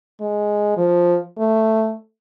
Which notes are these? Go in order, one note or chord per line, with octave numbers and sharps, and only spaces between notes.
G#3
F3
A3